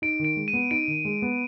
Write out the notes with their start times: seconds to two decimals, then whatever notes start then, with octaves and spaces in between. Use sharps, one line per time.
0.02 D#4 D7
0.19 D#3
0.25 D7
0.36 G#3
0.48 D#7
0.53 B3
0.71 D#4 D7
0.88 D#3
1.05 G#3
1.22 B3